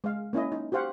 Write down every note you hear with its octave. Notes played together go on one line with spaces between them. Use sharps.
G#3 F5
A#3 C#4 E4 D#5
D#4
F#4 G4 C5 F5 F#5